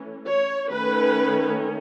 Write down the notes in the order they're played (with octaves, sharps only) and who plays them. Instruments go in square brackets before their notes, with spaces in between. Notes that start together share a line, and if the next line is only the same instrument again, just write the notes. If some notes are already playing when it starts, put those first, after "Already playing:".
Already playing: [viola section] E3 A3 C#4
C#5
D#3 A3 C#4 B4